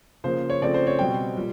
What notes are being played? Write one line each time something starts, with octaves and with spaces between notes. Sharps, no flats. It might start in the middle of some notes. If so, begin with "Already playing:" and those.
C#3 F3 A#3 C5
C#5
C#3 F3 A3 C4 D5
C5
C#5
B2 G3 C4 G5
A#2 G3